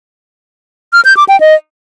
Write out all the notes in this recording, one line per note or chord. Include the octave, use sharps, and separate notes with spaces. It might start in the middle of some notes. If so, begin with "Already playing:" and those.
F6
G6
D6
G5
D#5